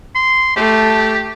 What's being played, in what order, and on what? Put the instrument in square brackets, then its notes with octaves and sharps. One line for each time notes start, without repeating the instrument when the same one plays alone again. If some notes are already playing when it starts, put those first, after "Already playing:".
[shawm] C6
[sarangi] A3 [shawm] G4